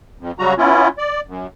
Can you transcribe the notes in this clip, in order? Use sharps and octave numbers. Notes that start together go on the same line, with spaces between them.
F2
C#3 F#3 G3 F#4 A#5
B3 C#4 E4 F4
D5
F#2